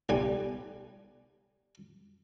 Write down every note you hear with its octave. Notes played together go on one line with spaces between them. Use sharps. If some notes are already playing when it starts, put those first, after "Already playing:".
B1 G3 G#5